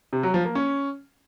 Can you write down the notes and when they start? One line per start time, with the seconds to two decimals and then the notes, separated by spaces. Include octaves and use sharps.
0.13 C3
0.23 F#3
0.34 F3
0.45 A#3
0.55 C#4